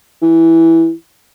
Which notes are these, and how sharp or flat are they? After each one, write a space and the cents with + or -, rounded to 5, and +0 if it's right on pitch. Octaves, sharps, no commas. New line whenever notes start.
E3 -5